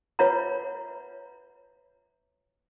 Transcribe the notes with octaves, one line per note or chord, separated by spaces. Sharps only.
F4 B4 C#5 E5 F#5 A#5